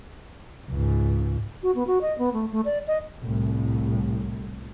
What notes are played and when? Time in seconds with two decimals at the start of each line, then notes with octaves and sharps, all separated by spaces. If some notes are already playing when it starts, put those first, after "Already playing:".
0.70 C#2 G#2
1.63 F#4
1.75 B3
1.87 F#4
2.01 D#5
2.18 B3
2.33 A3
2.52 A3
2.65 D5
2.87 D#5
3.23 C2 A2